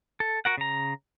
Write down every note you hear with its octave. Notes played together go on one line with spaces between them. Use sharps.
A4
F#4 A#4 F#5
C#3 A#5